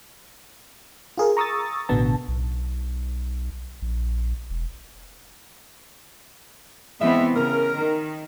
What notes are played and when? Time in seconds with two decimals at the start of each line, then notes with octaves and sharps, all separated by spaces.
1.18 F4 G#4 A#4
1.37 A#5 C#6 D#6 E6 A6
1.89 A1 B2 D3 B3 A5
2.28 B1
3.82 A#1
4.50 E1
7.00 E3 G#3 B3 C4 E5
7.36 C#3 A#4
7.76 D#3